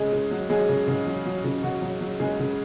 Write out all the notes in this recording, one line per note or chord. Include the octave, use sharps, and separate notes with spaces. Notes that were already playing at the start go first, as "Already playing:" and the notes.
Already playing: C#3 G#3 G#4
C#3
F#3
F#3 G#3 G#4
C#3
C#3
F#3
F#3
C#3
C#3 F#4
F#3
F#3
C#3 G#3 G#4
C#3